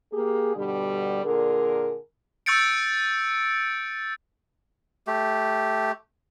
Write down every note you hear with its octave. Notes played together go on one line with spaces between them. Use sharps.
A#3 G4 G#4
G2 B2 D3 G3
A#2 D3 G#4 A#4
C#6 E6 G6 A6 C#7 D7
A3 G4